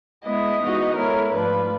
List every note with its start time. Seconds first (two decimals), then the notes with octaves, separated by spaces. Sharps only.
0.24 G#3 B3 E4 D#5
0.60 E3 G#3 B3 D#4 F#4
0.96 G#3 B3 E4 A4 A#4 C#5
1.32 G#2 F3 A3 D4 F4 B4